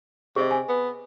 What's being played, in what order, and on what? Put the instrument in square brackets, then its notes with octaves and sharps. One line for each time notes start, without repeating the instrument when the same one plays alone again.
[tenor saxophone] C3 [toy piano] G#4 D#5
[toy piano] G#5
[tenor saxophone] B3